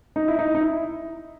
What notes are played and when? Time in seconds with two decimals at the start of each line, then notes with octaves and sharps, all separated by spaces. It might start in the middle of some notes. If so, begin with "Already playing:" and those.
0.16 D#4
0.28 E4
0.39 D#4
0.55 D#4
0.61 E4